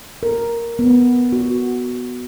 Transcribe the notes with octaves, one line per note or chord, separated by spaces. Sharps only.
A#4
B3
F#4